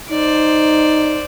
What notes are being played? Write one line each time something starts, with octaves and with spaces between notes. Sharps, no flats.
D#4 C5 D5